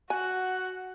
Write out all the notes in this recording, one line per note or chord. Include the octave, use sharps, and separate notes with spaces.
F#4 F#5 G#5 F#6